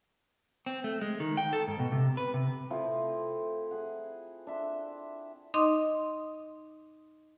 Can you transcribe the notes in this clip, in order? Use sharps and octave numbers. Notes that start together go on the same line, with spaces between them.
C4
A3
G#3
D#3
G5
A4
G#2
B2
C3
B4
C3
F3 A3 C4 E4
G#4 F#5
D4 E5 C6
D#4 D#5 C6 D6 D#6